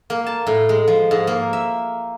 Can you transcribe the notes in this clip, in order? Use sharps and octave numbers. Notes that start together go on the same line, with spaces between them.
A#3
A5
A2
G#3
F3
G#2
A#3
E5